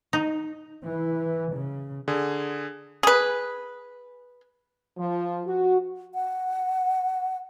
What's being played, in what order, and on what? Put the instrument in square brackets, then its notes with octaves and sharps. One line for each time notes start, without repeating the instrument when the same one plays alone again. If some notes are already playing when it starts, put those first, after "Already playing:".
[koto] D#4
[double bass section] E3
C#3
[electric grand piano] D3 G#4
[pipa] G#4 B4
[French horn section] F3
F#4
[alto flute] F#5